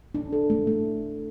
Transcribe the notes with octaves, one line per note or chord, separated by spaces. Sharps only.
D4
A4
A3
A3